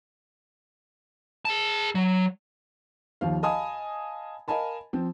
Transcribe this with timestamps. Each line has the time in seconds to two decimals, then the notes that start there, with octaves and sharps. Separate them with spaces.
1.45 G#4 A5
1.95 F#3
3.21 D#2 F3 F5
3.43 D#5 F5 G#5 A5 B5 D#6
4.48 A#4 D#5 F5 G#5 A5 B5
4.93 F3 C4